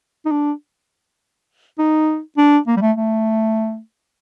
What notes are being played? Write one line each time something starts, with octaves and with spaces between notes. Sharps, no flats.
D#4
D4
D#4
D4
A#3
G3
A3
A3